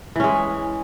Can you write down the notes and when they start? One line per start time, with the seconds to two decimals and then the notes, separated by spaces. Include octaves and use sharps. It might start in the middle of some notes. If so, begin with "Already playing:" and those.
0.16 E3
0.20 C#4
0.24 G#3